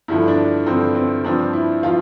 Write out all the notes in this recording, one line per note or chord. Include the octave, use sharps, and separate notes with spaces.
G2 D3 F3 E4
D4
G2 D3 F3 C4
C4
G2 F3 C4 D4
E4
F3 F4